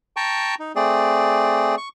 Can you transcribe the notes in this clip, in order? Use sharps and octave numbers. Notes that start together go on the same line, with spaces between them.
G5 A5 A#5 C#6
D#4
A3 C4 G#4 D5
C#6